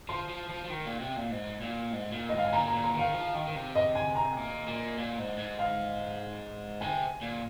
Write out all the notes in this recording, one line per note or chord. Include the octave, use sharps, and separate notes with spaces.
F3 C6
F3
F3
F3
D#3
A#2
C3
A#2
G#2
A#2
G#2
A#2
G#2 D#5
F5
G#5
A#2 A#5
A#5
A#2
A#5
D#3
F5
F3
D#3
D#3
C3
D#5
G#5
A#5
A#2
A#2
A#2
G#2
G#2
F5
C3 G#5
A#2